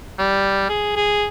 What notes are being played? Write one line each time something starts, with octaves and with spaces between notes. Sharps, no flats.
G3
G#4
G#4